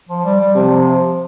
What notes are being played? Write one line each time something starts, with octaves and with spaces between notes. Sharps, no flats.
F3
G3
G3
C3 F3